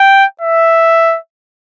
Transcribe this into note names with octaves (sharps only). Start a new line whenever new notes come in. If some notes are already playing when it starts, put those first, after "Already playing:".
Already playing: G5
E5